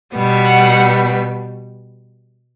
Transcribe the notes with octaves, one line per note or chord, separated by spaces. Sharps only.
B2 G3 B3
F#5